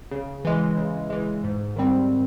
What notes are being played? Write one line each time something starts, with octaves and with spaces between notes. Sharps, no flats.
C#3
E3 G#3
C#3
E3 G#3
G#2
D#3 G3 C4